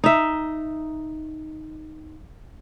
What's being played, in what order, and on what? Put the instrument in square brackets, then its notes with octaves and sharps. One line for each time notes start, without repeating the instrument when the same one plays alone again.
[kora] D#4 E5